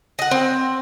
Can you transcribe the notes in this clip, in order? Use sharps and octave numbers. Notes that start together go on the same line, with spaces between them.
D#5 F#5
C4 C5 G5